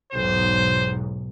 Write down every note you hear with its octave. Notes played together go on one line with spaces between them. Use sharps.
B1 E2 G#2 C5